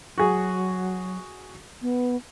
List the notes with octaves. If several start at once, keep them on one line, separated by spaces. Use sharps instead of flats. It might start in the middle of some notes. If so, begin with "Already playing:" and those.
F#3 F#4 G#4
B3